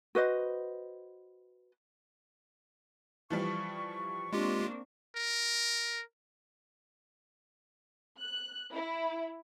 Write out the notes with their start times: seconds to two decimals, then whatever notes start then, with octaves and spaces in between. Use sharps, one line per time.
0.15 F#4 B4 C5 D#5
3.30 E3 F3 G3 C#6
4.33 G#3 A#3 C4 D4 F4 G4
5.16 A#4
8.18 F#6
8.74 E4